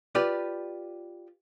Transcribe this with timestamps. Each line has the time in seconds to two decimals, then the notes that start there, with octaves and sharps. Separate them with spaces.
0.15 F4 G4 B4 D5